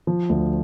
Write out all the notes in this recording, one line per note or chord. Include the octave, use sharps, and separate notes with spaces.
F3
D2